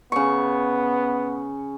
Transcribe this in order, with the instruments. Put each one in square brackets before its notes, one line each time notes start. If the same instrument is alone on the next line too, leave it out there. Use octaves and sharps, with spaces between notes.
[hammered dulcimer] C#3 C#6 [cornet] B3